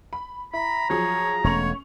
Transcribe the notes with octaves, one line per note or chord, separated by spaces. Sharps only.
B5
E4 A#5 B5
F3 F#3 G#4 C#5
E1 A3 C#4 C#5 C#6 F7